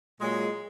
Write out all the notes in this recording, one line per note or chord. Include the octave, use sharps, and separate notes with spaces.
A#2 F#3 G#3